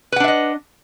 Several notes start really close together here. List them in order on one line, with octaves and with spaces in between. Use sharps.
B4 F#5 D4 E5 D#5